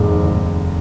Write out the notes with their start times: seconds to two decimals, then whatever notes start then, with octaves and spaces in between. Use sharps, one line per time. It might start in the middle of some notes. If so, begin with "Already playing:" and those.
Already playing: F1 D#2 G#2 G#3
0.23 F1